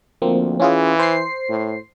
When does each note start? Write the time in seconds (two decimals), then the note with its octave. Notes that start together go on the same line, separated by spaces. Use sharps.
0.22 D2 F3 A#3 C4
0.60 E3 C#4 F4 G#4
0.99 C5 C7
1.49 A2